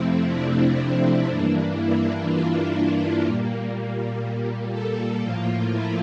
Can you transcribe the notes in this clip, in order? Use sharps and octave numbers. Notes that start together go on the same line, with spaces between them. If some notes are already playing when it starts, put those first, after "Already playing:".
Already playing: F2 C3 F3 A3 C4 E4
D4
C4
G2 E3 A#3 D4
E4
F4
E4
A#2 G3 A#3
A4
A2 F3 A#3 F4
E4